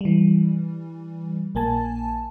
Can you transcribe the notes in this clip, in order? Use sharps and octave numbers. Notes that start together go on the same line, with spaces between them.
E3 G3
A#1 A#3 G#5 A5